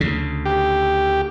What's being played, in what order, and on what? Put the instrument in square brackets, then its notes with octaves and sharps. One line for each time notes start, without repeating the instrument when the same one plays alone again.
[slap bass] D2 C#3
[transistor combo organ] G4